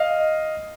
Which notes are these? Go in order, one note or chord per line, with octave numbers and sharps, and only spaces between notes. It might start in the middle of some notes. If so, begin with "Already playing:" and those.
Already playing: D#5 F5